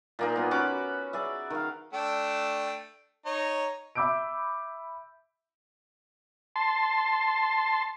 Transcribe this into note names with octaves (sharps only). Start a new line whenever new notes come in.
A#2 A#3 D#4
B3 F4
C#4 F#4 B5 D6
G#4 D5 E5
D#3 F5
A3 D4 G5
D#4 C#5
E5 B5 D6 E6 G6 D7
A5 C6